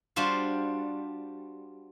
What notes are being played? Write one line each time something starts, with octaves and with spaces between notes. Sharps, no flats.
G3 D4 F4 F#4 C5